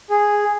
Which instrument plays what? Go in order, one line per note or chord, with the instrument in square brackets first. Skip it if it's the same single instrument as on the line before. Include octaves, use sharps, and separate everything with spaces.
[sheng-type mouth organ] G#4